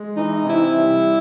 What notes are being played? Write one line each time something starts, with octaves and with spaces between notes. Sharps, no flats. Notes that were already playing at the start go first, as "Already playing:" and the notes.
Already playing: G#3
E3 D#4
C3 E4
G3